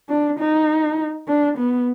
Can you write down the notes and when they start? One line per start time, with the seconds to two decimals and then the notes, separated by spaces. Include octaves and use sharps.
0.09 D4
0.39 D#4
1.28 D4
1.58 B3